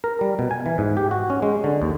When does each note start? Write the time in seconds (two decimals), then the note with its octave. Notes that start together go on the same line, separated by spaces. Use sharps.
0.04 A#4
0.21 G3
0.39 B2
0.51 G#5
0.66 E3
0.78 G#2
0.97 G4
1.11 F#4
1.30 C#4
1.42 G#3
1.64 D3
1.82 D#2